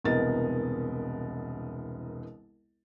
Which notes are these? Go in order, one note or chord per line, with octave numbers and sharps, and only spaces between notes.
E1 C2 B3 A#4 D#5 A6